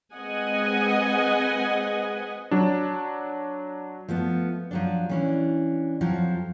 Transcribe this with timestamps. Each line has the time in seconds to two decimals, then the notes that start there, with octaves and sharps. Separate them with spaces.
0.15 G#3 C4 B4 D#5 F#5 G#5
2.51 F#3 D4
4.08 F3 A3 B3
4.71 F3 F#3 D4
5.09 E3 C#4 D4
6.01 F2 F3 F#3